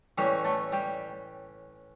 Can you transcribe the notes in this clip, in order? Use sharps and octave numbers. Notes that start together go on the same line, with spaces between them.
A2 E3 G3 C#4 G4
A3 A4
G3 G4